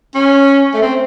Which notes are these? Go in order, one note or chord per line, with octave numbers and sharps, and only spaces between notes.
C#4
A3
C4